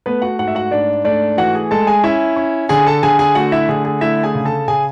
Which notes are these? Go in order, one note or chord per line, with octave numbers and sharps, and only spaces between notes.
A3 B3 B4
F#4 F#5
G#2 F#4 F#5
E5
F#4 F#5
G#2 D4 D5
A3 D4 D5
E3 F#4 F#5
G#4 G#5
G#3 A4 A5
G#4 G#5
C#4 E4 E5
C#4
D3 G#4 G#5
A4 A5
D3 G#4 G#5
G#4 G#5
A3 F#4 F#5
E4 E5
D3 G#4
G#4
A3 E4 E5
G#4 G#5
C#3
A4 A5
C#3 G#4 G#5